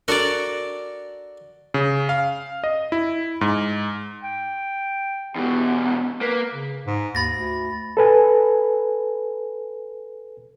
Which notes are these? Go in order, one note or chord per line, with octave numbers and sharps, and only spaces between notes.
D4 F#4 A4 A#4 D5
C#3
F5
D#5
E4
G#2
G5
E2 B2 G4
A#3 B4
C#3
G#2
D#2 B5 A6 A#6
D2
A4 B4 G#5